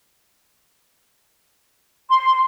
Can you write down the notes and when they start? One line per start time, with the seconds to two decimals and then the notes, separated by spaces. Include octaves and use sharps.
2.11 C6